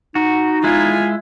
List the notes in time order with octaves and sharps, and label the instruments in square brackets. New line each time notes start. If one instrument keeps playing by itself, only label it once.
[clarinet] D#4 [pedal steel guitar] F#4
[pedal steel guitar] G#3 E4 [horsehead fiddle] F4 G#5